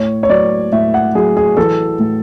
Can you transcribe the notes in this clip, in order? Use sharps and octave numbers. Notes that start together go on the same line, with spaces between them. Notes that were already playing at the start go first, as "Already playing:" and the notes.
Already playing: A2 C#5
C#5
F#3 D5
A2 E5
F#5
F#3 G#4
G#4
E3 A4
A2